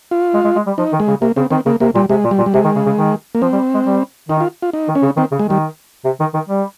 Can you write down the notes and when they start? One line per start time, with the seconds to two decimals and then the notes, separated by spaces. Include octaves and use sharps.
0.11 F4
0.34 G#3
0.45 G#3
0.56 G#3
0.67 G3
0.78 F3 D#4
0.93 D#3
1.00 G#3
1.08 C#3
1.21 C3 A#3
1.36 C#3 C4
1.51 D#3 C4
1.66 C#3 A#3
1.80 C3 A#3
1.95 A#2 G3
2.09 C3 G#3
2.24 A#2
2.31 G3
2.39 A#2
2.46 G3
2.54 C3 G#3
2.64 D#3
2.76 C#3
2.86 C#3
2.97 D#3
3.35 A#3
3.42 F3 C4
3.53 G3
3.74 G#3
3.85 G3
4.29 D#3 D#4
4.40 F4
4.62 F4
4.73 D#4
4.89 D#3
4.95 C#4
5.03 C#3
5.17 D#3 C4
5.32 C#3
5.39 G#3
5.47 D#3 G3
6.05 C3
6.20 D#3
6.34 D#3
6.49 G3